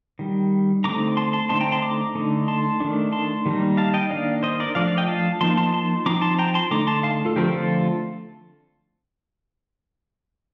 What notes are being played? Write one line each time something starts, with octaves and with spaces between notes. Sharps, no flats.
D#3 G3
D3 A3 C4 D#4 A#5 D6
A5 C6
A5 C6
D3 A3 C4 D#4 A5 C6
G5 A#5
A5 C6
A#5 D6
D3 A3 D#4
A5 C6
D#3 A3 D4
A5 C6
D#3 G3 A#3 D#4
F5 A5
D#5 G5
D#3 A#3 D4 D5 F5
C5 D#5
A#4 D5
F3 A3 D4 D5 F5
D5 F5
D#5 G5
F5 A5
F3 A#3 D#4 A5 C6
A5 C6
A5 C6
F3 C4 D#4 A#5 D6
A5 C6
G5 A#5
A5 C6
D3 A3 D#4 A#5 D6
A5 C6
F5 A5
F4 A4
D3 F3 A3 C4 G4 A#4
F4 A4